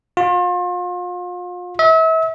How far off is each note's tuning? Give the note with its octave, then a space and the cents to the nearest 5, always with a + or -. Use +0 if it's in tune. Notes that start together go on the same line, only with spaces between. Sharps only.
F4 +35
E5 -35